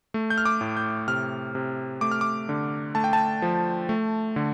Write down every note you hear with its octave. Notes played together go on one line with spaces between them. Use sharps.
A3
G6
F6
D6
A2
G6
C3 F6
C3
A3 D6
F6
D6
D3
A3 A5
G5
A5
F3
A3
D3